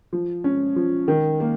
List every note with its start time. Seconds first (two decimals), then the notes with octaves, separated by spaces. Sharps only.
0.13 F3
0.44 C#4
0.76 F3
1.08 D#3
1.40 A#3